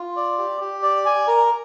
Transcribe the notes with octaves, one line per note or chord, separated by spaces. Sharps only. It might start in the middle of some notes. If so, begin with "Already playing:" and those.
Already playing: F4
D5
G4
G4
D5
G#5
A#4